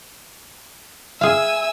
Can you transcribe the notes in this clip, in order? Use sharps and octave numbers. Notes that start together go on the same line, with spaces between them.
G#4 E5 F5 G#5 E6